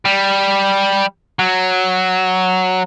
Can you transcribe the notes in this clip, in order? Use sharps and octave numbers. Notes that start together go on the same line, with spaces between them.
G3
F#3